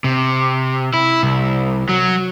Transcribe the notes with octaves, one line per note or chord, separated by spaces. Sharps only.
C3
E4
C2
F#3